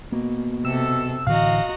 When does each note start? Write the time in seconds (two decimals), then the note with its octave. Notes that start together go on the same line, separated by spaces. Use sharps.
0.12 B2 A#3
0.65 C3 A4 E6
1.27 A2 D3 E3 F#4 D#5 F5 A#5